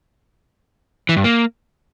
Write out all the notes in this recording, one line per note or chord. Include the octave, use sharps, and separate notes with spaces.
E3
G2
A#3